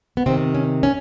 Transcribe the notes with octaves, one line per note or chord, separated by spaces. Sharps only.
B3
C3 D#3 C4
C#4
C#4